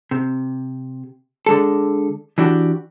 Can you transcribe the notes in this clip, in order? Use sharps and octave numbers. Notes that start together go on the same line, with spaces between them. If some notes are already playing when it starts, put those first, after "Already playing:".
C3
D3 G#3 A4
E3 D4 F#4 G4